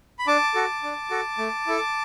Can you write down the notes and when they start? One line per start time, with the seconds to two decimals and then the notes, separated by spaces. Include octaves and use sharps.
0.19 B5
0.27 D4 A5 D6
0.54 F#4 A4
0.83 D4
1.11 F#4 A4
1.38 A3
1.67 E4 A4